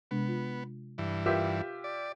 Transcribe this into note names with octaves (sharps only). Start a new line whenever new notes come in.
C3 G#3 B3 D4
F4
G2 E3
F4 G4 A#4 B4 E5 E6
D5